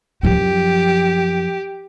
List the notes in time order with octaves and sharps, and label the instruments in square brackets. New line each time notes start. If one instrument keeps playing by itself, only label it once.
[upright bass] F#2 F3 [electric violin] G4